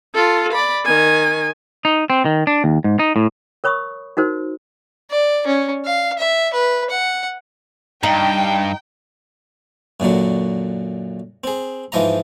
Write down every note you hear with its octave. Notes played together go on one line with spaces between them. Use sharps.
F4 A4
D5 B5
D#3 G#5
D#4
C4
D#3
D4
D#2
G#2
D#4
A2
A#4 C#5 B5 C#6 D#6
D#4 F#4 A#4 C5
D5
C#4
F5
E5
B4
F#5
G2 D#4 G5
F#2 A#2 D3 F#3
C4 G#4
G#2 E3 F3 D#5 A#5